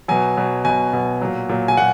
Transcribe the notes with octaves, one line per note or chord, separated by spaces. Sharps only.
B2 F#3 G#5
B2 F#3
B2 F#3 G#5
B2 F#3
A#2 F#3
A#2 F#3
G#5
A#2 F#3 F#5